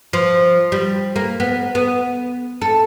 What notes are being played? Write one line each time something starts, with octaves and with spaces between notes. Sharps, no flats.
F3
G3
A#3
B3
B3
A4